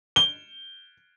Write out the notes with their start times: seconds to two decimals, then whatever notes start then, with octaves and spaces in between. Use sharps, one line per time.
0.16 G7